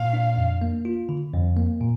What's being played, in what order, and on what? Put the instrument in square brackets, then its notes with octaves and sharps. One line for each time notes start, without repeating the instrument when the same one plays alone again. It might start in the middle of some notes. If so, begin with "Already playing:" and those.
Already playing: [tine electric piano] A#2 [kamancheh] F5
[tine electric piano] D4
F2
A#3
F4
D3
F2
A#3
A#2